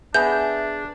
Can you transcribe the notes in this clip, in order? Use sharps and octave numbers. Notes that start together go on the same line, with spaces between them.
B3 D4 G#4 E5 F#5 G6